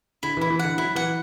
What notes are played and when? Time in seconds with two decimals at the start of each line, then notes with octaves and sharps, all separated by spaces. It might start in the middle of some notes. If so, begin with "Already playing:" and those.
0.23 D3 E4
0.37 E3 E4
0.50 E3
0.59 F#5
0.65 D3
0.78 F#3 E4
0.95 E3 F#5